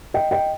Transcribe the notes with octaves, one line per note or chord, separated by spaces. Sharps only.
D#5 G5
D#5 G5